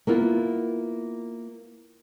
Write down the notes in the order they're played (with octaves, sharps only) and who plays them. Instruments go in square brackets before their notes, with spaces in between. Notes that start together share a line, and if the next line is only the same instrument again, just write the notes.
[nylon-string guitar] A#3 B3 E4 F4